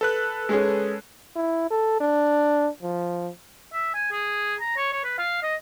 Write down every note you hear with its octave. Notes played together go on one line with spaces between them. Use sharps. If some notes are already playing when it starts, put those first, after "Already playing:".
A4 B4 F#6
G#3 C#4 G#4
E4
A4
D4
F3
E5
G#5
G#4
A#5
C#5
C#5
B4
F5
D#5